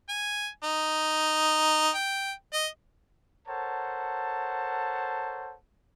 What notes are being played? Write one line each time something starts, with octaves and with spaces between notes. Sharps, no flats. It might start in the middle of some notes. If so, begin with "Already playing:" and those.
G#5
D#4
G5
D#5
A4 A#4 C5 C#5 F#5 A5